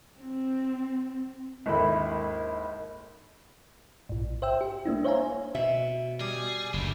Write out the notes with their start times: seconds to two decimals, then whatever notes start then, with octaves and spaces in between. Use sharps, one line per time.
0.20 C4
1.66 G#1 D#2 D3 E4 B5
4.09 A#1 G#2
4.42 C5 E5 G5 E6
4.61 G4
4.86 A3 A#3 D4 E4
5.04 C5 C#5 E5 F5 G#5 A#5
5.55 B2 E5
6.21 G3 G#4
6.74 F#1 D2 G3 A3